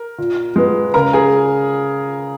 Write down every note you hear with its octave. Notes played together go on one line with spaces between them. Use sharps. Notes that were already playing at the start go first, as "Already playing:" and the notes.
Already playing: A#4
A#2
G#3 B3
C#3 A#4 A#5
G#4 G#5